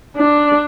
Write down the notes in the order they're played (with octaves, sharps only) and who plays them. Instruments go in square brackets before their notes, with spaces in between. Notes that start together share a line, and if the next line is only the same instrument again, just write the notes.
[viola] D4